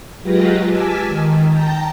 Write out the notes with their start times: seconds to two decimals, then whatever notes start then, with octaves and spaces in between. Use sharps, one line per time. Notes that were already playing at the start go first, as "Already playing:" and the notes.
0.22 F#3 G#3 F4 G4 B4 A#6
0.67 G#5 A5 D6 E6 F6 B6
1.05 D#3
1.48 G5 A5 A#5 G6